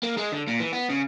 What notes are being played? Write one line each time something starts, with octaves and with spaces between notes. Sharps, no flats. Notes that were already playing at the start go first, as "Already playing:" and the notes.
A#3
G#3
D3
A#2
E3
B3
C#3